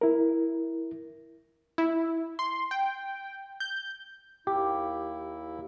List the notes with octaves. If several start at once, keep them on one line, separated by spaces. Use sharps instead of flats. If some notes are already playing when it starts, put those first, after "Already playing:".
E4 A#4
E4
C6
G5
G6
D#2 E4 G4